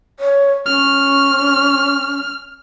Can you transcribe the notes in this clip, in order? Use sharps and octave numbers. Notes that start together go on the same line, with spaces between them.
C#5
C#4 F6